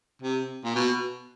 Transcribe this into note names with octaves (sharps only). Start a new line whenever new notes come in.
C3
A#2
B2